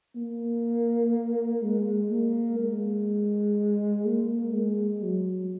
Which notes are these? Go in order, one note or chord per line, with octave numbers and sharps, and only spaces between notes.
A#3
G#3
A#3
G#3
A#3
G#3
F#3